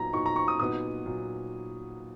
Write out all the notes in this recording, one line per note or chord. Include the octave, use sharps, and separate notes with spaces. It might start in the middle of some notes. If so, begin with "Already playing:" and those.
Already playing: A#2 F#3 B3 D#4 A#5
A#2 F#3 B3 D#4 C#6
A#5
C#6
D#6
A#2 F#3 B3 D#4 D#6
A#2 F#3 B3 D#4